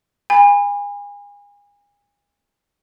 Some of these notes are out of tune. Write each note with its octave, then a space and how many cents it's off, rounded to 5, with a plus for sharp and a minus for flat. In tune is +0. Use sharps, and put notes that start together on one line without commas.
G#5 -35 B5 +0